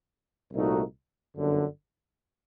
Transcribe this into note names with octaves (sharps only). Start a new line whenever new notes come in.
C2 A#2 A3 D#4 F#4
G1 F#2 D3